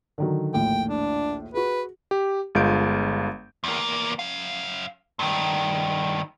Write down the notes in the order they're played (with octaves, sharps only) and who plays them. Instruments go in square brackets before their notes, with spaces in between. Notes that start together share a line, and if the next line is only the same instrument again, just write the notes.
[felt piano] D3 D#3 F#3
[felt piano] A#1 D#2 A2 [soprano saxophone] G5
[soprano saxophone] D4
[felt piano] F#4 G#4 [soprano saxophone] B4
[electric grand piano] G4
G1 G#3 F4 F5 G6 D7
[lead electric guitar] E2 A#3
F#2 F5
G2 D#3